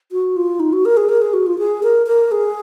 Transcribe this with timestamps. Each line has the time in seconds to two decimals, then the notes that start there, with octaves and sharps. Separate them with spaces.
0.12 F#4
0.36 F4
0.60 D#4
0.73 F#4
0.85 A#4
0.97 G#4
1.09 A#4
1.22 G#4
1.33 F#4
1.47 F4
1.59 G#4
1.83 A#4
2.07 A#4
2.32 G#4